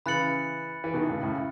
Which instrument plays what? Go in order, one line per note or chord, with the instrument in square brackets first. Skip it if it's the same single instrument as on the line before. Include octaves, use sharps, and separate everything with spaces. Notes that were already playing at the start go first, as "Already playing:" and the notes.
[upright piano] C#3 E3 [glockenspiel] B5 F#6 A6 C#7 F#7
[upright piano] E3
B2 D#3
A2 C#3
A2 C#3